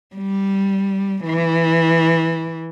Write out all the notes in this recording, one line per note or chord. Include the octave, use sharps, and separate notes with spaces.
G3
E3